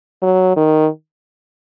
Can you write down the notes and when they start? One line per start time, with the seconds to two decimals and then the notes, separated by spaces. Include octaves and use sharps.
0.22 F#3
0.57 D#3